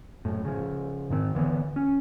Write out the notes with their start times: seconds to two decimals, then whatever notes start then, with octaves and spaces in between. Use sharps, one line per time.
0.25 F#2 A2
0.45 C#3 F3
1.10 G#2 D#3 C4
1.35 D3 E3 A#3 B3
1.76 C#4